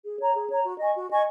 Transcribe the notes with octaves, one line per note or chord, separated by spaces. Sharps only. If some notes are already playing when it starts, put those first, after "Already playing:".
G#4
C#5 A#5
G#4
C#5 A#5
F#4
D#5 G#5 C#6
F#4
D#5 G#5 C#6